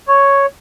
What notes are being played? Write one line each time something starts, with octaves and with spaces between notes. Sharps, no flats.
C#5